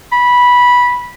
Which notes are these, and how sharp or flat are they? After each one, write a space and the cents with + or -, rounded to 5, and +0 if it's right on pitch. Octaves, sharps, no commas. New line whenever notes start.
B5 -10